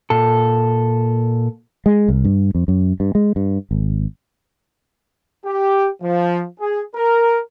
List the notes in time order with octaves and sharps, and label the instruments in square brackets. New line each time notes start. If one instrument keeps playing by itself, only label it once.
[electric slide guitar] A#2 A4
[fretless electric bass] G#3
C2
G2
F2
F#2
G2
G#3
G2
G#1
[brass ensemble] G4
F3
G#4
A#4